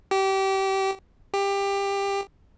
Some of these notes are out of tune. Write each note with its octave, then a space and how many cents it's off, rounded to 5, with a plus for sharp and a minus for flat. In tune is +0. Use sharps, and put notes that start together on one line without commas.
G4 -25
G4 +20